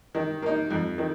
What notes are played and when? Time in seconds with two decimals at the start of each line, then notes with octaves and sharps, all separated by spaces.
0.15 D#3
0.42 A#3 D#4
0.71 F2
0.98 D#3